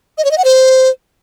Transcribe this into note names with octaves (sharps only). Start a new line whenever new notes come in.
D#5
C#5
D#5
F#5
C5